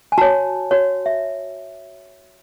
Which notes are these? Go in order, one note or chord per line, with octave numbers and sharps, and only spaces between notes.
G#5
F#4 C#5 A5
F#4 C#5
E5